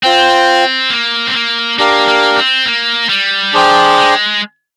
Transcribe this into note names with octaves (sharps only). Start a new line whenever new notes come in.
C4 F4 C5 G5
A#3
C4
A#3
A#3 D4 G4 A#4 F5
A#3
C4
A#3
G3
F3 D4 G#4 C5 G5
G#3